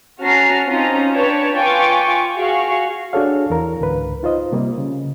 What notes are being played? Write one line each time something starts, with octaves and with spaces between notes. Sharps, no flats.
C#4 F#4 A5 A#5 F6 C7
C4 C#4 D#4 F4 A#5
D4 B4 C#5 G5 A5
F4 B4 G5 G#5 C#6 D6
F#4 G#4 F5 C#6
D4 F#4 G#4 A4 C#5 F5
E2 E3 A#4 A#5
C#2 G#2 D3 B4
D#4 F4 C5 D#5
C3 G3 A#3
C#3